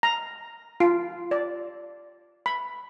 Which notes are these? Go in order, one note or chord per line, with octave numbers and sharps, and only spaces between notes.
A#5
F4
D5
B5